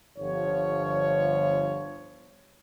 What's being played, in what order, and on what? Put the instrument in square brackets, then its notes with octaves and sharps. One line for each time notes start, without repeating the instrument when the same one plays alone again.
[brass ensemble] G1 F3 C#5